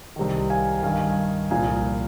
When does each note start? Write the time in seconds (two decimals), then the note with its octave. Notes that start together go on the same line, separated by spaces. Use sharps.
0.16 C2 C3 D#3
0.50 F5 G#5
0.83 G2 D#3 F5 G#5
1.51 C2 A#2 F3 F5 G#5